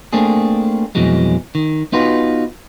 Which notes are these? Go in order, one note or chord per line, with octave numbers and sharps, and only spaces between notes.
A3 A#3 C4 D4 G#4
F2 B2 E3 F#3 G#3
D#3
B3 D#4 F4 F#4 B4